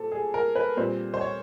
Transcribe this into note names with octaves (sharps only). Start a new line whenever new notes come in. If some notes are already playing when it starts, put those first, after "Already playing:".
Already playing: A#2 C4 G4 A4
G#4
A#4
B4
A#2 G3 C4 C5
C5
C#5